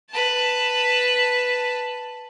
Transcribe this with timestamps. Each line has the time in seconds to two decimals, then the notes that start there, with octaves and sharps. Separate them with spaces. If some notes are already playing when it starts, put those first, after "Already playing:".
0.10 B4 A5